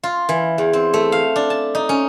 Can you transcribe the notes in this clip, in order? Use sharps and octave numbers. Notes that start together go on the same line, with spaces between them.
F4
E3
E2
C4
A3
F5
D4
A5
D#4
C#4